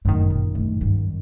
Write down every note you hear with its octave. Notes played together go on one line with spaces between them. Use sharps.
G1 F#2 A2 D#3
A#2
A2
G2